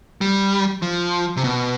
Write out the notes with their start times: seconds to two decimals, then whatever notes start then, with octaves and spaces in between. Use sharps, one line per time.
0.21 G3
0.82 F3
1.37 C3
1.44 B2